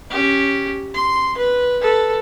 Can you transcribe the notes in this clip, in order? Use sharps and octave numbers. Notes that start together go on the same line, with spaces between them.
C#4 G4
C6
B4
A4 B4